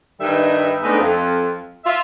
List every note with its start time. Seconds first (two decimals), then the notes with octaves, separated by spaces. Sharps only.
0.20 G2 D#3 G3 D#4 B4 E5
0.83 G#3 A3 B3 C4 D4 D#4
1.00 F2 F4
1.85 F4 E5